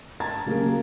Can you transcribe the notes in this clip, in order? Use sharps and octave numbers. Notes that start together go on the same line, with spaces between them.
A5 A#5 G#6 A6
C#3 F#3 A#3 G4 G#4 A#4